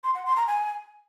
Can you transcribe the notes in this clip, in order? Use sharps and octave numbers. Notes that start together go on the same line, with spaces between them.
C6
F#5
C6
A#5
G#5